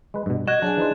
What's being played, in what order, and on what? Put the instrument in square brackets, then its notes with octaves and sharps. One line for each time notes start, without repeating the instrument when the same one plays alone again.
[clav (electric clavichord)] G#3 B4
G2 B2
[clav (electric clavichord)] F#4 [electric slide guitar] D#5 [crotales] F#6 G#6 E7
[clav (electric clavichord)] F#3 [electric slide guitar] D4 [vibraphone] G#4 G#5
[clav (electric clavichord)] E3 D#4 C5